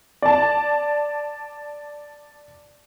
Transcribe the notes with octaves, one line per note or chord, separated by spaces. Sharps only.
D5 A5